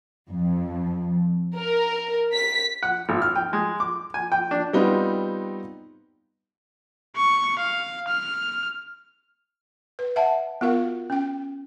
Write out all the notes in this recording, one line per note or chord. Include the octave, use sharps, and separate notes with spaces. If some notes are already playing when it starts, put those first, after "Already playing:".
F2
A#4
B6
F#5
G#1
F6
G5
G#3
D6
G#5
G5
D4
G3 B3 C4 D#4 F4 F#4
C#6
F5
F6
B4
E5 F#5 A5
B3 F4 F#4 A#4 F5
C#4 G5